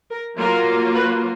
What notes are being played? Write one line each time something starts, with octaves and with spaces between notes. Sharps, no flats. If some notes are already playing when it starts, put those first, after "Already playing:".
A#4
F#3 A#3 F4 A#4
B4